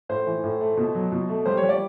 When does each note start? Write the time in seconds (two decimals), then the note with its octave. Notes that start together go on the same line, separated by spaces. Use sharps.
0.09 A2 C5
0.27 E3
0.44 A2
0.61 A3
0.77 B2
0.95 F#3
1.12 B2
1.29 A3
1.46 G3 C5
1.57 C#5
1.63 G3
1.69 D5